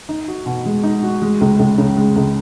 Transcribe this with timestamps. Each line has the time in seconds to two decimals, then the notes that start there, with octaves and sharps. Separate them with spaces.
0.09 D#4
0.28 F#4
0.46 B2
0.65 G#3
0.83 D#4
1.03 F#4
1.22 G#3
1.41 C#2
1.59 C#2
1.78 C#3
1.97 G#3
2.16 C#2